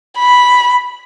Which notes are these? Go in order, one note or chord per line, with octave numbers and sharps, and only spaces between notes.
B5